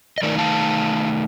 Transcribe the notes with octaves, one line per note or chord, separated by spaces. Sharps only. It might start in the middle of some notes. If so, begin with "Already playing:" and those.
D#5
D#3 A3 D#4 A#4 D5
F5 A5